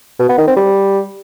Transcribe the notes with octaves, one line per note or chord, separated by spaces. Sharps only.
B2
B3
D#3
C4
G3